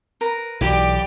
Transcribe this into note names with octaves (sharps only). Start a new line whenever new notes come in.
A#4 B4
B1 E3 G4 D5